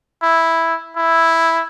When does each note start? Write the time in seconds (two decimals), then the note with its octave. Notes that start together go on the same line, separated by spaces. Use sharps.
0.23 E4
0.96 E4